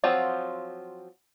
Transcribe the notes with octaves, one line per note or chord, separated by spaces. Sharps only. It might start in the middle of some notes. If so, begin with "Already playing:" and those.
F3 F#3 C4 F4